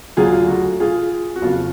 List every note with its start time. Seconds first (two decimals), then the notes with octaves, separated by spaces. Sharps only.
0.17 D2 D3 F#3 F4 G#4
0.33 F4
0.48 F#4
0.80 F4 G#4
1.36 F#4
1.42 F#1 F2 F3 F4